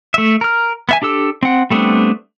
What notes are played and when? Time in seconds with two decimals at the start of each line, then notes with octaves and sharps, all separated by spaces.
0.14 A3 E5
0.41 A#4 F6
0.89 B3 E5 G#5
1.02 D4 G4 A4 E6
1.43 C4 F#5
1.70 G3 A3 B3 C4 D4